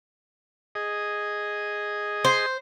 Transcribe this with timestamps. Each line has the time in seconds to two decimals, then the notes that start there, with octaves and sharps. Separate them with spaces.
0.75 G#4 D#5
2.25 C5